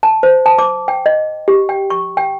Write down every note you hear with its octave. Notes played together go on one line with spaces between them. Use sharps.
A5
C5
A5
D6
G5
D#5
G4
G5
C#6
G5